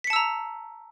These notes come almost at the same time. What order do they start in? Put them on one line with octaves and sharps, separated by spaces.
B6 C#7 A5 E6 A#5